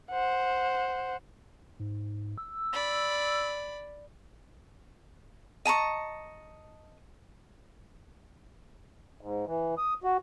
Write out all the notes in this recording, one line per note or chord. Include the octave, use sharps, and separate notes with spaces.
C5 F#5
G#2
E6
D5 B5
D#5 A5 A#5 C#6
G#2
E3
D#6
F#4